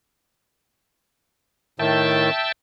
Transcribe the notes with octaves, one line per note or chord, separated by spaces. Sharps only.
A2 D#3 E5 G5 A5